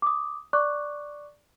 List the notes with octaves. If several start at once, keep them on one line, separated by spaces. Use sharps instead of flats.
D6 D#6
D5 C#6 D6 F#6